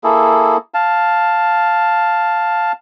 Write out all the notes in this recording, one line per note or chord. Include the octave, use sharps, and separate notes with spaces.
A#3 E4 G#4 A4
F5 A5